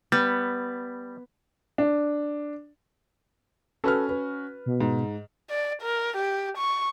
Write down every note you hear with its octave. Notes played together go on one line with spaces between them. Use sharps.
G3 B3
D4
C#4 F#4 A4 B4 F6
B4
B2
G#2
D5
A#4
G4
C#6